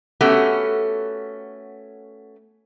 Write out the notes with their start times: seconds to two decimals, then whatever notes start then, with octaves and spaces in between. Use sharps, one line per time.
0.21 A3 B3 C#4 F#4 G4 A4